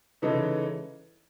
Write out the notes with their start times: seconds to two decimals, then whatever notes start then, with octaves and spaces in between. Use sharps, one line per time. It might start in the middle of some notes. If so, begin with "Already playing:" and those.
0.22 C#3 E3 G#3 D#4 A4